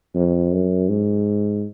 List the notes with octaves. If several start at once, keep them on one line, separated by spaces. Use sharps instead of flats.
F2
F#2
G#2